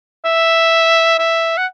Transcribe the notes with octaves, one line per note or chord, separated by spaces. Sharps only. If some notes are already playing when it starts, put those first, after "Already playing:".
E5
E5
F#5